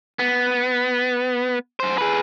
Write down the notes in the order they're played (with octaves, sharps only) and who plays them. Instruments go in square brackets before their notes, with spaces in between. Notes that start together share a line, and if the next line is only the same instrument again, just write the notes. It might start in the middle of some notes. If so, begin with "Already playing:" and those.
[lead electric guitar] B3
F#2 C5
G#4 B4